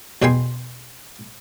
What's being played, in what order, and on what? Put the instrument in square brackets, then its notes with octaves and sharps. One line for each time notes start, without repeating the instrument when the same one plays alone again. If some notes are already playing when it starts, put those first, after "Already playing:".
[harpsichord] E2 B2 G#4 G5 G#5 C6